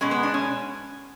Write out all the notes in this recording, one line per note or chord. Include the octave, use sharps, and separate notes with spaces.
B2 G#3 C#4
B3
D4
C#4